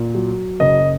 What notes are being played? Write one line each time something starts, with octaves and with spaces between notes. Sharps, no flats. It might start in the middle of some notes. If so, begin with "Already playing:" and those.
Already playing: A#2
F#3
F#1 D#5